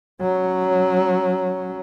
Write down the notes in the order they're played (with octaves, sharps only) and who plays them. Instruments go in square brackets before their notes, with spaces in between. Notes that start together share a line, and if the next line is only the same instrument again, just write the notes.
[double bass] F#3 C#4